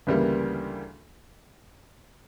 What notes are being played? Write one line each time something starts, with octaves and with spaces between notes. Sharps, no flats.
D2 C#3 E3 G3 A#3